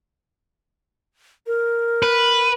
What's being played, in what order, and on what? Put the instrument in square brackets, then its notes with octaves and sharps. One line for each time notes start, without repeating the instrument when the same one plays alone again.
[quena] A#4
[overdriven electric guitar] B4